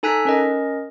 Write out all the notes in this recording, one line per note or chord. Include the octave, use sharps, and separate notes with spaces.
D#4 A4 G#5 A#5 F#6 B6
C#4 A#4 D#5